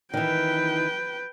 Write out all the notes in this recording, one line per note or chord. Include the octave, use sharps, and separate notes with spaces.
D#3 E3 B4 G5